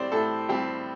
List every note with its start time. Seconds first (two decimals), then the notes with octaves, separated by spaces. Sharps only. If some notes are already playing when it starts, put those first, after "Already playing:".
Already playing: A2 G3 C4 C5 D5
0.12 A2 A4
0.49 G3 C4 G4